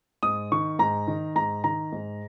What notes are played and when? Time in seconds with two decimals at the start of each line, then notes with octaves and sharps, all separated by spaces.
0.23 G#2 D#6
0.52 D#3 C#6
0.79 G#2 A#5
1.08 D#3
1.35 G#2 A#5
1.64 D#3 A#5
1.92 G#2